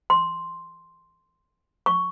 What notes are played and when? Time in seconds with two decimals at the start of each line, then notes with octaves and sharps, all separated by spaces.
0.10 C6
1.86 C#6